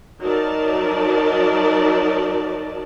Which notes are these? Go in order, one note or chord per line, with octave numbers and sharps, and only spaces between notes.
F#3 D#4 A#4 D5 A5